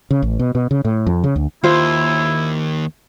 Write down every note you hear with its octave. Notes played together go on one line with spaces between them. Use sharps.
C#3
A1
B2
B2
C#3
A2
F2
C#3
D2
D#2 E4 F4 C5